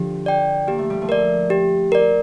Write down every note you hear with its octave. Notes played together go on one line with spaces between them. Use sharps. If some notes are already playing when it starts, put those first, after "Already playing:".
Already playing: D3 F3 G4
D5 G5
A#3 G4
A3
G3
F3 A3
A#4 D5
G4
A#4 D5